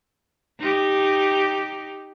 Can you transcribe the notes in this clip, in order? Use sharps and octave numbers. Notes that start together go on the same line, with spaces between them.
D#4 G4